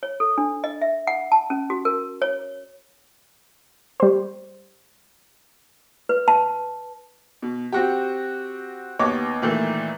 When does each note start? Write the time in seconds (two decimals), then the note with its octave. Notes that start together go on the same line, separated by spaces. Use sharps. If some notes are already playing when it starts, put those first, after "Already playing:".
0.03 C#5
0.20 A4
0.38 D4
0.64 D#5
0.82 E5
1.07 F#5
1.32 A5
1.50 C#4
1.70 F#4
1.85 A#4
2.22 C#5
4.00 G3 C5
6.09 B4
6.28 A5
7.42 B2
7.73 C4 F#4 G4
8.99 D#2 B3 C#5 D#5 D6
9.42 A#2 D#3 E3 A3